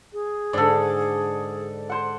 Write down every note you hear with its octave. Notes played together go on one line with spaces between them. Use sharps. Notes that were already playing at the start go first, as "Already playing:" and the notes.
G#4
G#2 D3 A4 D5
C5 F#5